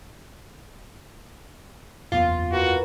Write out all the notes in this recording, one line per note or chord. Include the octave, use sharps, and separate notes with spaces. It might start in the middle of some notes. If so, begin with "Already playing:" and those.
F#1 E2 B3 F4 D5
E3 F#4 A#4